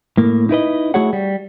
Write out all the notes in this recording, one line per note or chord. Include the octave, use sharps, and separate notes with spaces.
A2 A#3
D#4 E4 B4 D#5
A3 E4 F#4 G#4 C#5 F#5
G3